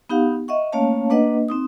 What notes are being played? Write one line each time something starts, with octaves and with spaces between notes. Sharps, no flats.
B3 D#4 G4 F5 F#5
D#5 E5 F#5 C#6
A3 A#3 C#4 C#5 F5 A5
A#3 D4 B4 D#5 F#5
C4 D#4 D#6